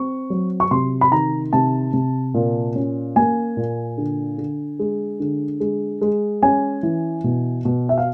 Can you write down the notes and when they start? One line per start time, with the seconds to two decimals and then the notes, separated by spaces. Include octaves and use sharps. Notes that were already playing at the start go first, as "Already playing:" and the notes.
Already playing: C4 C#6
0.30 F#3
0.60 C#6
0.71 C3 C6
1.01 B5
1.11 D#3 A#5
1.53 C3 A5
1.93 C3
2.34 A#2
2.75 C#4
3.16 A#3 G#5
3.57 A#2
3.98 D3
4.38 D3
4.79 G#3
5.20 D3
5.60 G#3
6.01 G#3
6.43 C#4 G#5
6.83 E3
7.24 B2
7.65 B2
7.89 E5
7.98 F5